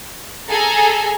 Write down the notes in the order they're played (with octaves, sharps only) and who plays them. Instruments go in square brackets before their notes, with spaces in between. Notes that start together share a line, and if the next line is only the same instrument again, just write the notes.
[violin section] G#4 A4 G#5 A#5